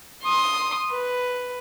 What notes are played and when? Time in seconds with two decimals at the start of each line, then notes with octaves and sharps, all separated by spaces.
0.24 C6 D#6
0.91 B4